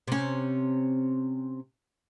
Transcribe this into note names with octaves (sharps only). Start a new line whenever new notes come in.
C3 C#4